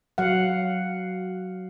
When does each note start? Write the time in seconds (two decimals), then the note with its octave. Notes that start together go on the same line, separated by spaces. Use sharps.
0.18 F#3 F5 F#5